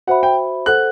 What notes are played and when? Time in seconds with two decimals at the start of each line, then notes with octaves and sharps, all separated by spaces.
0.07 F#4 C5 E5 F#5 B5
0.23 G5
0.66 A4 C5 F#5 F#6